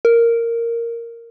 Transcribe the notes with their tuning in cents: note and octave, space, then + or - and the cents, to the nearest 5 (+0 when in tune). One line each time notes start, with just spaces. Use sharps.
A#4 -5